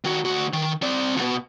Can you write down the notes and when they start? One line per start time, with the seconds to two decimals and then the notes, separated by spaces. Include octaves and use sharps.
0.04 D#3 F#4
0.25 D2 F#4
0.53 D#3
0.82 C4 D5
1.17 D2 B2